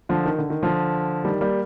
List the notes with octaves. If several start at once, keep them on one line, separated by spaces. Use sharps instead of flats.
D3 F3
D#3
D3
D#3
D3 F3
D#3 G3
G3 A#3